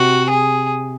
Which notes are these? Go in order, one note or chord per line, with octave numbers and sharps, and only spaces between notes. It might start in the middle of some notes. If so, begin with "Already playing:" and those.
Already playing: C3 F#4
G#4